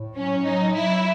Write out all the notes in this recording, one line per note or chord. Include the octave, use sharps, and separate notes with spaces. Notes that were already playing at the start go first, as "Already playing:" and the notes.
Already playing: A2
F#3 C#4
F#3 D#4
F#3 E4